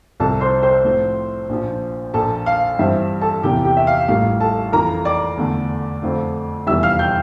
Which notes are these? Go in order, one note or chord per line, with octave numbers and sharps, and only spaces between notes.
C2 C3 F3 A4 A5
C5 C6
C5 C6
A2 F3 C4
A#1 A#2 F3
A#1 A#2 F3 A#3 A4 A5
F5
G2 E3 G3 C4 E5
A4 A5
E2 C3 E3 A#3 G4 G5
G4 G5
E5
F5
A1 A2 G3 A#3 F4 F5
A4 A5
F2 E3 A#3 F4 A#4 A#5
D5 D6
E2 D3 A3
F2 D3 A3 C4 F4
F1 E2 E3 G3 E5 E6
F5 F6
G5 G6